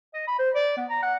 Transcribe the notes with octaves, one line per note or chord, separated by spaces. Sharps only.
D#5
B5
C5
D5
B3
A#5
F#5